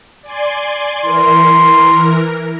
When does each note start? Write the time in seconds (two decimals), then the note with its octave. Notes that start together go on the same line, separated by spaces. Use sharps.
0.23 D5 G#5 C6
1.02 E3 A#4 C6